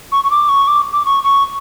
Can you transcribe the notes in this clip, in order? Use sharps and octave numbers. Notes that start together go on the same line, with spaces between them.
C#6
C#6
D6
C#6
D6
D6
C#6
C#6